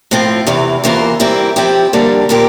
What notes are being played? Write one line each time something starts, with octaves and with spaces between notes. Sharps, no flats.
A2 F3 C4 F4
E2 C3 E3
E2 E3 A#3 F4 C5
E3 G3 C4 E4 A#4
F3 C4 E4 G4
D3 G3 A#3 D4
A#2 F3 C4 G4 A#4